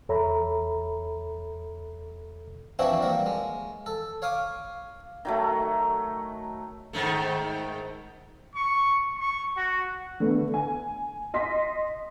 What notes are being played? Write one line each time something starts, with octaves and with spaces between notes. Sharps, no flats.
E2 A4 C#5 E5 A#5 B5
E3 F3 C4 D4 E4 F#4
F#3 G3 A#3
G#3
A4
C#5 F5 D6 D#6
D#3 F#3 A3
G#2 D#3 A3
C#6
C#6
F#4
D3 A3 B3
G#5
D#5 C6 B6